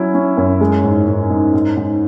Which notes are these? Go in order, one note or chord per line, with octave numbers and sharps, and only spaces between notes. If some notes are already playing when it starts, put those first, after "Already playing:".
Already playing: F#3 C#4 E4
C#4
F#2
G#3
G#2
G#2
G#2
G#2
G#2